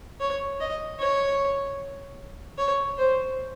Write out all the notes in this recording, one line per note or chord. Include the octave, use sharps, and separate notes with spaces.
C#5
D#5
C#5
C#5
C5